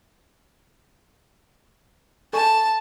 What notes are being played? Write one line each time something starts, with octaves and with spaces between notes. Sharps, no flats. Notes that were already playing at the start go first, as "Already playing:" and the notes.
A4 G#5 A5 C#6